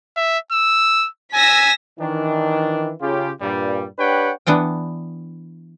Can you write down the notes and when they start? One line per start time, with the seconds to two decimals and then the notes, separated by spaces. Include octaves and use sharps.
0.17 E5
0.52 E6
1.34 G#5 E6 A#6 B6
2.00 D#3 E3 D4
3.01 C#3 F4 G4
3.42 G2 A#2 G3
3.99 D4 G4 B4 C#5 F#5 G5
4.47 E3 B3 D4 F#5 G5